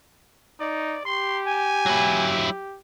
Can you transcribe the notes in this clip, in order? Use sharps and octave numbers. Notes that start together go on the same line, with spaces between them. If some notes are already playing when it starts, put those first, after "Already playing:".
D#4 D5
G4 C6
G#5
F#3 E4